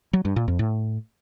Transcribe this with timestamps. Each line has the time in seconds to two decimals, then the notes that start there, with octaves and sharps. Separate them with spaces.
0.13 F#3
0.25 G2
0.36 A#2
0.48 F2
0.59 A2